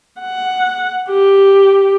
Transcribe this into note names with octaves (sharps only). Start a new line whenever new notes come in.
F#5
G4